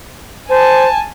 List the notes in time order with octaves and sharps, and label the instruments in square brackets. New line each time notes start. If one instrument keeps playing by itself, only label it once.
[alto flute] C5 [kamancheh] G#5 A5